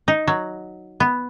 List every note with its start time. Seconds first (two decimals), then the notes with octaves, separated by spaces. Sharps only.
0.08 D#4
0.27 F#3
1.00 B3